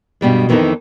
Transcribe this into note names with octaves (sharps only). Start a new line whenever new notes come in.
G2 B2 G3 G#3
F2 D#3 E3 B3 D#4 A4